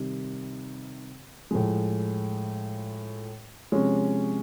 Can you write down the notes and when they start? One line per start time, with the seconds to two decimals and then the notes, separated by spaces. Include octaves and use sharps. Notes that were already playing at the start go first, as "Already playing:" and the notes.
Already playing: C3 D#3 G3
1.51 A2 F3 G#3
3.72 C3 F3 G#3 C#4